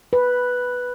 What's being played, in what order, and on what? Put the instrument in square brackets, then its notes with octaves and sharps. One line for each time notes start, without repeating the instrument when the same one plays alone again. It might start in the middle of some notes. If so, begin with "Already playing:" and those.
[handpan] B4